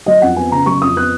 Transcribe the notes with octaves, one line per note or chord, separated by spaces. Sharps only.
F#3 D#5
F2 F#5
B3 G#5
C#3 A#5
F#3 C#6
F2 D#6
B3 F#6